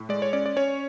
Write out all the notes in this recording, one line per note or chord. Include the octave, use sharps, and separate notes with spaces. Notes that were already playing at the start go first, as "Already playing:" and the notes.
Already playing: A2
G#3 D5
C#5
C#4 D5
D5
C#4 C#5